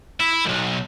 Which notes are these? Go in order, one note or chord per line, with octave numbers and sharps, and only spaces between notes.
E4
B1 F#2